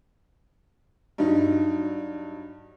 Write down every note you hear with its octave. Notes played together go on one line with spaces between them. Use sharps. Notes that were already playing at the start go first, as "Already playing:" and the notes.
G2 F#3 D#4